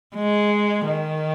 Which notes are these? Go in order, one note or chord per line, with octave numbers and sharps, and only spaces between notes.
G#3
D#3